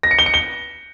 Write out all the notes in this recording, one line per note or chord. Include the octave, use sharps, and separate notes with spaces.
A#6
C#7
G7
C#7
G7